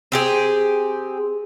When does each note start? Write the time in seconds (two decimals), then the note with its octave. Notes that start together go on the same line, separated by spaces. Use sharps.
0.12 C4 G4 G#4